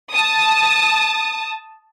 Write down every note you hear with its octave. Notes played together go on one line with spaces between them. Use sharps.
A5 D#6